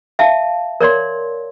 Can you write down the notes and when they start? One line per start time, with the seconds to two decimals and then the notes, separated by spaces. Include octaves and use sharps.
0.19 E5 F5 A5
0.80 A#4 C#5 D5 C6